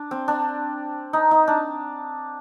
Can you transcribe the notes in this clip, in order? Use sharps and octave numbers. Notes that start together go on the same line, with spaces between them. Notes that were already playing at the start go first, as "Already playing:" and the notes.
Already playing: D4
C4
D4
D#4
D#4
D4